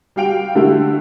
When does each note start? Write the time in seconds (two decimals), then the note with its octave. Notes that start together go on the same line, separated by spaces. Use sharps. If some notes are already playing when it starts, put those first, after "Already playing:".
0.16 G3 F#4 F5 G5 D7 F7
0.55 D3 A3 E4 F#4 G4